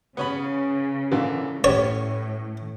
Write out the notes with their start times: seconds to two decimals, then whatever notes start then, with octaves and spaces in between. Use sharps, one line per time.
0.17 C#3 B3 C#4 B5
1.11 A#2 D3 E3
1.64 A2 B3 C#4 G4 C#5